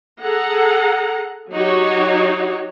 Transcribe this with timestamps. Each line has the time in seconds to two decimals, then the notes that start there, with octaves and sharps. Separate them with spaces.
0.21 G#4 A4 F#5 A#5
1.52 F#3 D#4 F#4 G4 C#5